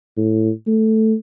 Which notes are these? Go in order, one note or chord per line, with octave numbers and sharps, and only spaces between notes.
A2
A3